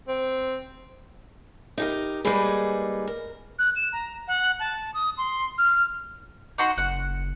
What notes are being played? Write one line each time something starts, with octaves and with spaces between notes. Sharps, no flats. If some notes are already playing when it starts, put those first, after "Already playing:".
C4
D#4 G4 A#4
G3 G#3 A#3 D#4 G#4 B4
A#4
F#6
E7
A#5
F#5
A5
D#6
C6
F6
D#4 F#4 C6
F#1 F#5